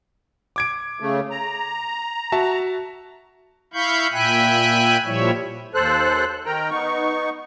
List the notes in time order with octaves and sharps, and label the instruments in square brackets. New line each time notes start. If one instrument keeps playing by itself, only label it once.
[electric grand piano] D6 G#6 D7
[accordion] C#3 A3
A#5
[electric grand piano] F#4 E5 A5
[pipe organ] E4 F5 B5 C#6 G6
A#2 E5 G5 G#5 B5 F#6
A#2 F3 G3 E4 C#5 E5
[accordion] D#2 A4 C5 F#6
D#3 A#4 G5 A#5
B3 D#4 C#6